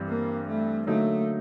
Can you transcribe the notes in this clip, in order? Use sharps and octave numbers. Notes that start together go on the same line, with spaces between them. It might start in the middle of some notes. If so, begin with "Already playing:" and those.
Already playing: G2 E3 G3 C4
A#3
A3
D3 F#3 A3 A#3 D#4